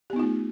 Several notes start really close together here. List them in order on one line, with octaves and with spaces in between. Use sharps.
G4 B3 D#4 F4 A3